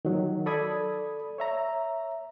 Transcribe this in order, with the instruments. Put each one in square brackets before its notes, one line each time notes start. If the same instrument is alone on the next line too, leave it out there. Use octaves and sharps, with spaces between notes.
[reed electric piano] D#3 F#3
A4 D5 B5 D#6 G#6
C#5 E5 A#5